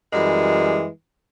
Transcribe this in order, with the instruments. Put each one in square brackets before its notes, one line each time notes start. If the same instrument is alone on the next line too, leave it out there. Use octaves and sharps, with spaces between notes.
[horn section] F#2 E3 G3 G#3